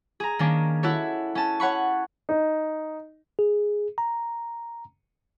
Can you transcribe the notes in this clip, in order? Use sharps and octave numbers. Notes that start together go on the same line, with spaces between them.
G#4 A#5
D#3 A#3 C#4 D4
E4 F#4 A4 C#5
C#4 A5
C#5 F#5 B5 C#6
D#4
G#4
A#5